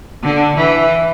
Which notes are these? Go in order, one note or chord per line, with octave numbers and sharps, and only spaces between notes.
D3
E3